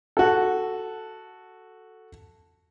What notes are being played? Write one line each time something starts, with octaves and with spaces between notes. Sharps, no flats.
F#4 A4